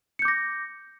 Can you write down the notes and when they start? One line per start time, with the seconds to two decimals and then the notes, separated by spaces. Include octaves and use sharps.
0.19 C#7
0.22 G6
0.25 D6
0.28 A#6